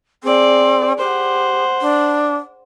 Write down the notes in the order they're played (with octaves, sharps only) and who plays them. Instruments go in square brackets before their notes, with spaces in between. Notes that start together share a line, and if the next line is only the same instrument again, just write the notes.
[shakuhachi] C4 [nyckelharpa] G#4 D5
[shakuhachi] G4 [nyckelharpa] C5 F#5
[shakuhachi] D4